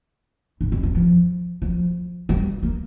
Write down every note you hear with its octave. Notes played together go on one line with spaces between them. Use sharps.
G2
F2
G2
F3
F3
G3
A#3